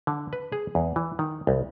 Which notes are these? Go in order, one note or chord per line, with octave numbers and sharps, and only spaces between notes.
D3
B4
G#4
E2
E3
D#3
C2